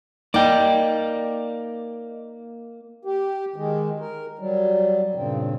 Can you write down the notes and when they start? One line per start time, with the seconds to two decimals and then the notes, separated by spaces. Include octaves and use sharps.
0.34 A#3 D#4 D5 G5
3.05 G4
3.56 D#3 G#3
4.00 A#4
4.39 F#3 G3
5.15 G2 A#2 C#3 C4